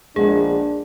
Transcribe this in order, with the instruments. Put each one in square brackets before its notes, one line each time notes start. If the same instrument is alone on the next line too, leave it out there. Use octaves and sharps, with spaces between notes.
[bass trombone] A#1 [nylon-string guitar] G#3 B3 [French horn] D4 [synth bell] G#4